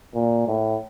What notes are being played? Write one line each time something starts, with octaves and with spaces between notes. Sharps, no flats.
A#2
A2